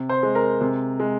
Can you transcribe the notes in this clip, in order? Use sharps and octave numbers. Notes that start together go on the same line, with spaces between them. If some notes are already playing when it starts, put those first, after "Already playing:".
Already playing: C3
C5 C6
G#3
A#4 A#5
C3
G#3